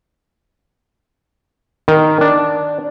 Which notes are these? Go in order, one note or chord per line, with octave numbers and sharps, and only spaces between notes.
D#3
D4